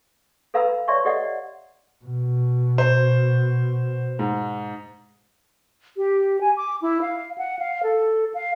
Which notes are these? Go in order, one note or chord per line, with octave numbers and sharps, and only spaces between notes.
A4 B4 F5 A#5 B5 E6
C#5 D5 E5 A5 C6 C#6
G4 A4 D5 D#5 F#5
B2
C5
G#2
G4
G#5
D6
E4
F5
F#5
F5
A4
F5